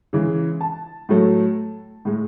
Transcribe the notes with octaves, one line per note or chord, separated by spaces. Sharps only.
C#3 E3 G#3
A5
A2 F#3 A3
A2 G#3